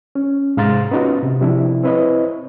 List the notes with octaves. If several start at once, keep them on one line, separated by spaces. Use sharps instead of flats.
C#4
G#2 C3 F5 A#5 C6 A6
B3 C#4 D#4 F4 F#4
C3
C3 F3 D4 E4
C4 E4 B4 C#5 D#5